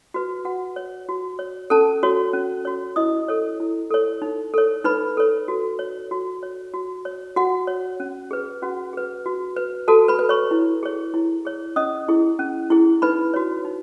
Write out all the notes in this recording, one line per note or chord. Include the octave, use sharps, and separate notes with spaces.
F#4 B4
F#4 F#5
C#5
F#4
C#5
C#4 A4 A5
F#4 C#5
C#4
F#4 C#5
E4 D#5 D#6
A4 C#5
E4
A4 C#5
D#4
A4 C#5
D#4 B4 B5
A4 C#5
F#4
C#5
F#4
C#5
F#4
C#5
F#4 F#5
C#5
C#4
G#4 B4
C#4 F#4 F#5
G#4 B4
F#4
B4
F#4 A4 A5
B4 B5
B4
C#5 C#6
E4
G#4 C#5
E4
G#4 C#5
C#4 D#5 D#6
E4 G#4
C#4
E4 G#4
D#4 B4 B5
F#4 C#5
D#4